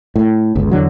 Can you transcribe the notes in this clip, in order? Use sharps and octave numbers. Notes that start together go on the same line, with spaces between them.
A2
G1 C#2
E2 D3 F#3